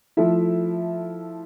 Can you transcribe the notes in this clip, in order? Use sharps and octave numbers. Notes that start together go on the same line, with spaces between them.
F3 A3 E4 A4 E5